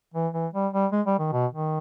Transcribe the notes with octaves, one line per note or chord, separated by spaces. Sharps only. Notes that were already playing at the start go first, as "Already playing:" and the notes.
E3
E3
G3
G3
G#3
G3
D#3
B2
D#3